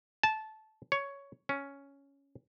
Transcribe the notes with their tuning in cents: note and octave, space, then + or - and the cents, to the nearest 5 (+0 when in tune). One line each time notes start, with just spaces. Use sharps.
A5 -15
C#5 +10
C#4 +5